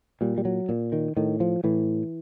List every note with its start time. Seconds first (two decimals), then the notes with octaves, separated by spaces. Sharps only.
0.21 A#2 G3
0.38 G3
0.45 F#3
0.69 A#2
0.92 D#3
1.17 A2 D#3
1.40 F3
1.64 A2 E3